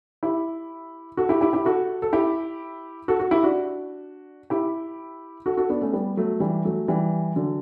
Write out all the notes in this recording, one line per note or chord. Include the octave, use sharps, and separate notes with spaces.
E4 G4
F#4 A4
E4 G4
E4 G4
E4 G4
F#4 A4
A4
E4 G4
F#4 A4
F#4 A4
E4 G4
D4 F#4
E4 G4
F#4 A4
F#4 A4
B3 D4
A3 C#4
G3 B3
F#3 A3
E3 G3
F#3 A3
E3 G3
D3 F#3